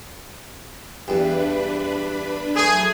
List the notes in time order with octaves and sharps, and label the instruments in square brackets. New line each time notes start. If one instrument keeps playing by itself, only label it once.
[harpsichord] E2 G2 [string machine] D4 B4 B5
[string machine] F#3 B6 [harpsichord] A3 [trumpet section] G#4